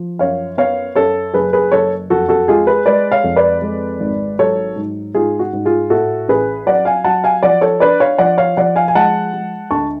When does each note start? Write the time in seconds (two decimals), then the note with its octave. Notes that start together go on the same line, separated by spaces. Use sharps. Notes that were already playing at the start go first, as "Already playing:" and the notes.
Already playing: F3
0.19 F#2 C#5 F5
0.57 B3 C#5 F5
0.95 F#2 A4 C#5
1.34 F#1 G#4 B4
1.53 G#4 B4
1.72 F#1 A4 C#5
2.10 F2 F#4 A4
2.29 F#4 A4
2.48 G#3 F4 G#4
2.67 G#4 B4
2.86 G#3 B4 D5
3.12 C#5 F5
3.24 F2
3.36 B4 D5
3.62 G#3
4.00 G#1
4.39 F#3 A4 C#5
4.76 G#2
5.15 G#2 F4 G#4
5.39 F#4
5.53 G#2
5.65 F4 G#4
5.90 A2 F#4 A4
6.29 A1 G#4 B4
6.66 F#3 D5 F#5
6.85 F5 G#5
7.04 F#3 F#5 A5
7.24 F5 G#5
7.43 F3 D5 F#5
7.61 A4 C#5
7.80 D4 B4 D5
8.00 C#5 F5
8.18 F3 D5 F#5
8.38 C#5 F5
8.57 F3 D5 F#5
8.76 F5 G#5
8.88 G#5
8.95 G#3 F#5 A5
9.33 G#3
9.71 D2 A5 C#6